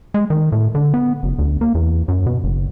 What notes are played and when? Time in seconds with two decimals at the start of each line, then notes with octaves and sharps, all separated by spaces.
0.14 G#3
0.30 D#3
0.52 A2
0.75 D3
0.94 B3
1.23 F#1
1.39 D2
1.61 A#3
1.75 E2
2.08 F#2
2.27 B2
2.44 F#1